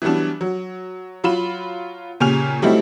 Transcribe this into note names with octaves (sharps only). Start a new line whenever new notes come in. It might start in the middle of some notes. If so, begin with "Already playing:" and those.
E3 F#3 G3 B3 D4
F#3
F#3 F4 B5 E7
A#2 C#3 G4 G#5 F6 F7
F#3 G3 A3 C4 D#4 E4